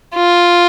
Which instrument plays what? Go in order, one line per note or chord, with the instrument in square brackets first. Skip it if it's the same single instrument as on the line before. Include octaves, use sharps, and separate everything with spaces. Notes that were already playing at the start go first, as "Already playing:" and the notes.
[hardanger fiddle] F4